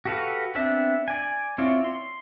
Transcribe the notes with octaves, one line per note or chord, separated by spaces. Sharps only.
F#4 G4 A4 B4 F5
B3 C4 D4 E5
D5 G#5
C4 E4 F4 C#5 D5
C6